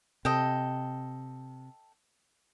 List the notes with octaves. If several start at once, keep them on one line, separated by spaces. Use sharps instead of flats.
C3 A4 D#5 G5